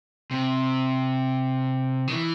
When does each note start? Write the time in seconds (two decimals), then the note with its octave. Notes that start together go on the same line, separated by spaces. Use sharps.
0.31 C3
2.08 D#3
2.12 E3